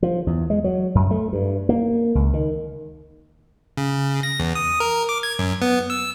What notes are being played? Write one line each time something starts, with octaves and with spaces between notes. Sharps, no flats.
F3
E2
G#3
F#3
F#2
A3
G2
A#3
C#2
D#3
C#3
A#6
E2
D#6
A#4
D6
G#6
F#2
B3
E6